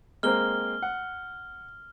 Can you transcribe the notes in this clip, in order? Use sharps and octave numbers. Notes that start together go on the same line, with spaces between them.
G#3 A#3 C4 F6 G7
F#5